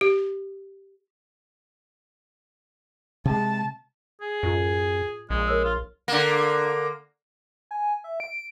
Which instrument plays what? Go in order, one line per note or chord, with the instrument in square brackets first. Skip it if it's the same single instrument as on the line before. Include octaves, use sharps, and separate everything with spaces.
[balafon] G4
[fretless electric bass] C3 G#3 [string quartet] A5
[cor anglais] G#4
[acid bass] F#2 [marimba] A2 F4
[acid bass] A#1 [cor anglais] G#3
[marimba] A#4 C#5 E6
[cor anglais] F4
[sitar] D3 A#3
[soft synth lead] G#5
E5
D7